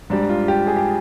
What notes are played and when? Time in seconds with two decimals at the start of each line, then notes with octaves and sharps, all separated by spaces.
0.10 G#2 G3 D4
0.29 F4
0.48 G4
0.67 G#4
0.77 G4